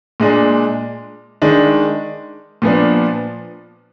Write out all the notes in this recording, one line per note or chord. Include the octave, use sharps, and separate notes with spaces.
A#2 G#3 D4
D#3 G#3 D4
A#2 F3 B3 D4